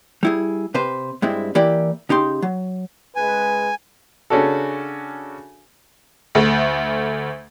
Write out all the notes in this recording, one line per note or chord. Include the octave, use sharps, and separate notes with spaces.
G3 E4 G#4
C3 B4 C5
G2 G#3 C4 E4
E3 A#3 E4 G4 D5
C#3 D#4 G4 C6
F#3
C#2 G#3 B4 G#5
C#3 C#4 D4 F#4 A4
D2 A3